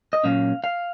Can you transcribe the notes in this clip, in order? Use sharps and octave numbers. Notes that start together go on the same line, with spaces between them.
D#5
A#2 F#3 A#3 C#4 F5
F5